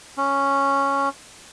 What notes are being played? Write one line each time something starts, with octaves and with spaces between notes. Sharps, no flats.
C#4